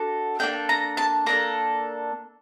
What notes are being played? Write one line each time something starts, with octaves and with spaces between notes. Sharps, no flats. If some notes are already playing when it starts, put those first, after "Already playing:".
Already playing: D4 F#4 A4
A#3 D4 A4 G5
A#5
A5
A#3 D4 A4 A#5